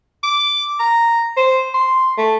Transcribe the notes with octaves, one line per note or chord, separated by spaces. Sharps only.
D6
A#5
C5
C6
A3